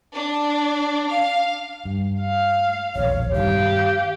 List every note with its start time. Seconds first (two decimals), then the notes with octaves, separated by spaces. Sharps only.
0.13 D4
1.10 F5
1.85 G2
2.20 F5
2.95 E1 A#1 D#2 C#5
3.34 G2 D#3 G4 F5